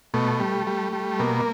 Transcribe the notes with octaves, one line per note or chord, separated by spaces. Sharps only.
B2 A3
G3
G3
G3
B2 A#3